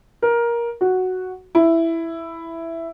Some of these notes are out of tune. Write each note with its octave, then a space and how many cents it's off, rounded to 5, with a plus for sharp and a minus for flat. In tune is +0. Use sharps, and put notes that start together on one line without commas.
A#4 +15
F#4 +0
E4 +5